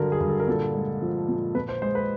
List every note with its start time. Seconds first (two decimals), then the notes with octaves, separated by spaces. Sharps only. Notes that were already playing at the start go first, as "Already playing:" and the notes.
Already playing: G2 D3 F#3 A#4
0.12 G#4
0.20 G2
0.29 A4
0.40 A#4
0.48 A#2 A4
0.75 G#3
1.02 F3
1.28 A#2
1.55 A#2 B4
1.69 C5
1.82 G#3 C5
1.95 B4